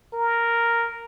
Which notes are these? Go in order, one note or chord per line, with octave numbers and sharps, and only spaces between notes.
A#4